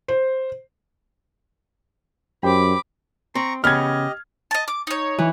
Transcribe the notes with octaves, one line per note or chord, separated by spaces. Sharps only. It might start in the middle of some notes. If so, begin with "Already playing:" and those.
C5
F#2 G4 C5 G5 B5 D6
C4 A#5 C#6
C#3 B3 G4 D#5 F6 G#6
D#5 A5
D6
D#4 C#5
E3